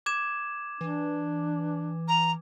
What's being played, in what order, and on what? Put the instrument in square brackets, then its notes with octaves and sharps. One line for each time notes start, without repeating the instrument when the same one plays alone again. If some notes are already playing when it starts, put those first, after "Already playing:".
[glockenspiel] D6 G#6 E7
[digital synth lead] E3 [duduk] D4
[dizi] A#5